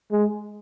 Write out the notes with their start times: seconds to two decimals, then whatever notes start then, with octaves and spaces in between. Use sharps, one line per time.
0.12 G#3